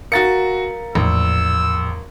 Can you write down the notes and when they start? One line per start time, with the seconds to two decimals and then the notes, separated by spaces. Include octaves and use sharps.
0.12 F#4 A#4 F5 A#5 A6 C#7
0.95 A#1 E2 A2 E6